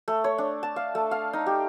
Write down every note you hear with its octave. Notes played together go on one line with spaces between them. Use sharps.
A3
C#5
D4
A5
F5
A3
F5
D#4
G4